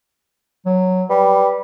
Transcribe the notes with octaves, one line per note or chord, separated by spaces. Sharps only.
F#3
G3 B4